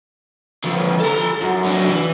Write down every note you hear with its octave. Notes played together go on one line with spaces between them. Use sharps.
D3 F3
A4 A#5
F#2
F#3 D4
E3